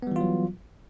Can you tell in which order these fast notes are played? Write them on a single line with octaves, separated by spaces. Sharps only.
B3 G3 E3 F4 F#3